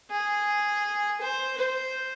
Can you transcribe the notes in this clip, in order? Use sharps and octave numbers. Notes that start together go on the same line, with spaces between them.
G#4
C5
C5